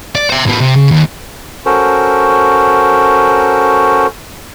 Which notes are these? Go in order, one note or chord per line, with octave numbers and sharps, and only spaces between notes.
D5
C5 E5
A2 B3
C3
C#3
D#2
C#4 F#4 A4 A#4 C5